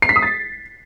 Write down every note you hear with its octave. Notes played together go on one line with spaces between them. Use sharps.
C7
B6
D#6
A6